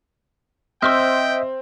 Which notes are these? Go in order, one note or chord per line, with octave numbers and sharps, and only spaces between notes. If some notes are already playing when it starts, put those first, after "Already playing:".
C4 C5 D#5 E5 G5 C6 E6 F6